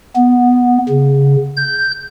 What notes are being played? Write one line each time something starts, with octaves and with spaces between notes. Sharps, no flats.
B3
C#3
G6